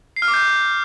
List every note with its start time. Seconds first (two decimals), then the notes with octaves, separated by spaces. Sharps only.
0.16 C7
0.22 F6
0.28 D6
0.34 G6